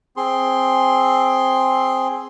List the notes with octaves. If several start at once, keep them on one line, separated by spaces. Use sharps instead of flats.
C4 G#4 C6